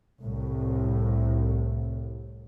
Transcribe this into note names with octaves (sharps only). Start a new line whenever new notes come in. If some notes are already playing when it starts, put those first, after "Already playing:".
C2 A2